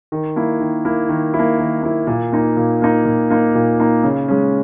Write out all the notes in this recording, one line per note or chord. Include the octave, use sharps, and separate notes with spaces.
D#3
A#3 E4
D#3
A#3 E4
D#3
E4
A#3
D#3
A#3 E4
A#2
A#3 D#4
A#2
A#3 D#4
A#2
A#3 D#4
A#2
A#3 D#4
C#3
G#3 C#4